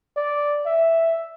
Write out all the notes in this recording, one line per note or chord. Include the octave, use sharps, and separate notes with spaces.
D5
E5